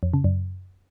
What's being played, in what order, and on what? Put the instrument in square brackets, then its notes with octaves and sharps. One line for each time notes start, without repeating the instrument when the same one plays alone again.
[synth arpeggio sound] F2
C#3
F#2